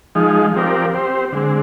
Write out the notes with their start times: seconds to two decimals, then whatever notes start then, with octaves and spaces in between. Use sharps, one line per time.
0.15 F3 G#3 D#4
0.54 F3 C4 G4 A#4 D5
0.94 C4 G4 C5
1.32 D3 G#3 C4